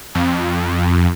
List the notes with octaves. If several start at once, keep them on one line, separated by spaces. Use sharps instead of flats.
F2